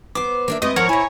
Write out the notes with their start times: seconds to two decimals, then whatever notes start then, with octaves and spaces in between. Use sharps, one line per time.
0.15 B3 C5 D6
0.48 A#3 D4 E5
0.62 C3 G#3 A3 E4 B4 D#5
0.76 G#2 F3 A#4 C#5 F#5 A#5
0.89 E4 G#5 A#5